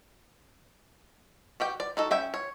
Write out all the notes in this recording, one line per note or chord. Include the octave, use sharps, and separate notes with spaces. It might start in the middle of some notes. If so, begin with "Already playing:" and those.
F#4 G4 G5
D5
D#4 F#4 A4
C#4 E5 G5
C#5